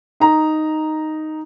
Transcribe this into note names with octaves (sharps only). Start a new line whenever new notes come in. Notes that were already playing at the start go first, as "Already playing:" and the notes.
D#4 A#5